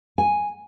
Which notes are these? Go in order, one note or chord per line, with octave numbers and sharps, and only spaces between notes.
G#5